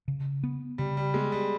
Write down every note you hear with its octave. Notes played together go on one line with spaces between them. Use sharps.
C#3
B3
C#3 G3
G3
G#3 B3
G3